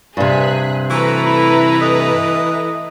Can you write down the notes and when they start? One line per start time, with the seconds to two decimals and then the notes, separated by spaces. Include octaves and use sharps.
0.17 G2 C3 G#4 F#6 B6
0.90 E3 A3 F#4 B4 A#5
1.26 E4
1.81 D#5